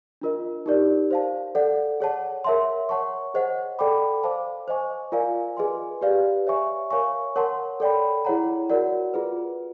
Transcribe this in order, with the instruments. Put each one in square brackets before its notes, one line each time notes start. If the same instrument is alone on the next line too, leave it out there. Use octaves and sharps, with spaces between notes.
[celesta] D4 F4 A#4 D#5
D#4 G4 A#4 D5
C5 F5 A5
A4 D5 F#5
G#4 C#5 F#5 A5
A#4 C#5 E5 A5 C6
C#5 F#5 A5 C#6
G#4 C5 D#5 F#5
A4 D5 G5 B5 D6
C5 F5 A5 D6
C5 D#5 G#5 C#6
F4 A#4 D5 F5 G#5
G#4 B4 D#5 G#5 C6
G4 B4 D5 F5
C#5 E5 G#5 C#6
A#4 C#5 F5 G#5 C#6
A#4 C#5 F#5 A5 C6
A4 D5 G5 B5
E4 G#4 C#5 F#5 A#5
F#4 A#4 D5 F#5
F4 G#4 B4